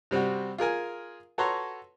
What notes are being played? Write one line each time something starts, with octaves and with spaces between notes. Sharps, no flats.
C3 G3 C4 F#4
F4 G#4 A#4 G#5
F#4 A4 B4 C#5 A#5 C6